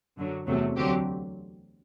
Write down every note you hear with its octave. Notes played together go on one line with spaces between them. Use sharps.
F#2 D3 F#3
E2 C3 F#3 A3
D2 D3 F#3 C4 G4